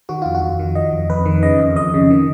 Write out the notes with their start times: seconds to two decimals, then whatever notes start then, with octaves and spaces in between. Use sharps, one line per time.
0.09 D#3 F#4
0.22 F2 F4
0.35 F#4
0.42 F2
0.59 D#3
0.75 D#3 D#5
0.93 F2
1.10 F2 B4
1.26 D#3
1.43 C#3 D#5
1.59 F2
1.76 F2 D#5
1.94 C#3
2.10 D#3